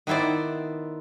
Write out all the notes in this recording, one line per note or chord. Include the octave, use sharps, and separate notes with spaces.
D#3 B3 E4 C5 D5